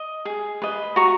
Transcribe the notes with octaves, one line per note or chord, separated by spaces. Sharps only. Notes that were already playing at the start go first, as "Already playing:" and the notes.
Already playing: D#5
G#4
B4 D#5
F#4 A#5 C#6